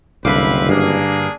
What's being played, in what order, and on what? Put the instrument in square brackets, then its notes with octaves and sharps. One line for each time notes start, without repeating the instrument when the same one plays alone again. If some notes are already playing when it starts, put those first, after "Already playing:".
[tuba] F#1 [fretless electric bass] C2 [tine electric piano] D3 F5 D6 [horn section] C4 E4 B4
[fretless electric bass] G2 [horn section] A#3 D4 G#4